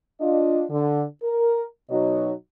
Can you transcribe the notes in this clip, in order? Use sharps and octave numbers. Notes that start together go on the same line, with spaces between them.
D4 F4 D#5
D3
A#4
B2 F#3 D#4 F#4 C#5 D#5